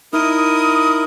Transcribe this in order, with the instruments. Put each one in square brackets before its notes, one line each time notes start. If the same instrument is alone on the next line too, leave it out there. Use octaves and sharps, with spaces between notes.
[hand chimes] D#4 [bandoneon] E4 A#4 [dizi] D#6